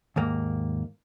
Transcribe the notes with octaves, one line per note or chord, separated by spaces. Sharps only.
D#2 G#2 A#3